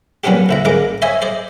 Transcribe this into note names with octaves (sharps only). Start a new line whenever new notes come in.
A#2 F#3 B3 C#4 D4 G4
D2 E4 A#5
A1 G#3 A#4 A#5 D6
C5 C#5 D#5 E5 G#5
C5 D5 D#5